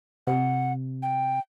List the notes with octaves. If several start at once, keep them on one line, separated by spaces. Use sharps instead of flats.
C3 F#5
G5